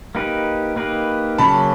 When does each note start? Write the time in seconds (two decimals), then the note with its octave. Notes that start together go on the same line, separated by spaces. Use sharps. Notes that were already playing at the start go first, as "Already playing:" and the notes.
0.15 A#3 D#4 G4 B4
0.76 A#3 D#4 G4 B4
1.38 C#3 F#3 A#3 C#4 A5 B5